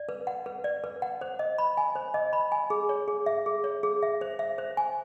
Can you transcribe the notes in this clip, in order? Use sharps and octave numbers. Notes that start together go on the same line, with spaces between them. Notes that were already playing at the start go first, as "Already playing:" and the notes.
Already playing: D5
B4
F#5
B4
D5
B4
F#5
C5
D#5
B5
G#5
C5
D#5
B5
G#5
G#4
C#5
G#4
E5
G#4
C#5
G#4
E5
C5
E5
C5
G#5